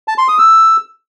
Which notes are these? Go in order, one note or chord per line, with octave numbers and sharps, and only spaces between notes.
A5
C6
D#6
E6